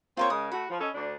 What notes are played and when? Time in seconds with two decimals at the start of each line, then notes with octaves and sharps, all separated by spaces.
0.17 A#3 C4 F4 C5 C#5
0.30 C#3 G#3 A#4 D#6
0.52 A3 F#4 B5
0.69 F3
0.80 C#4 A4 D#5
0.93 D2 D4